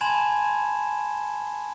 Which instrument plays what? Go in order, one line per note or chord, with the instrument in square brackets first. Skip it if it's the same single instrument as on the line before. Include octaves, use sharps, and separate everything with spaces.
[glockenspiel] G#5 A5 B5 C6 G#6 E7